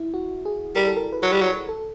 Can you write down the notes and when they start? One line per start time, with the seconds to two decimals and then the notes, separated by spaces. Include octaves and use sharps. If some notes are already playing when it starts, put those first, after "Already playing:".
Already playing: E4
0.14 F#4
0.45 G#4
0.76 G3 A#4
0.87 A4
0.97 A#4
1.13 B4
1.22 F#3 A#4
1.32 G3
1.41 F#3
1.69 A4